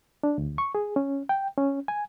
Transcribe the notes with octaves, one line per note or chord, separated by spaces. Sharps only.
D4
D2
C#6
G#4
C#4
G5
C#4
G#5